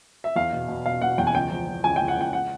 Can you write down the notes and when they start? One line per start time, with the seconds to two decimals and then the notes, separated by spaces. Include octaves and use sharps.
0.24 E5
0.36 E2 F5
0.52 B2
0.68 B2
0.85 B2 F5
1.01 B2 F#5
1.18 E2 G5
1.27 G#5
1.35 C#2 G5
1.51 F3
1.67 F3
1.84 C#2 G#5
1.96 C#2 G5
2.08 F#5
2.17 C#2 G5
2.33 F#5